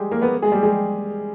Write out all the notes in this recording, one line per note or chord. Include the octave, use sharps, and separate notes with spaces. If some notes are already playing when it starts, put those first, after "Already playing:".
Already playing: G3 G#3 G4 G#4
A#3 A#4
B3 B4
G#3 G#4
G3 G4
G#3 G#4